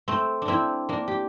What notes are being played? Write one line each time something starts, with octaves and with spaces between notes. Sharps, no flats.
A3 C4
D4
C4 E4
A#3 D4
G4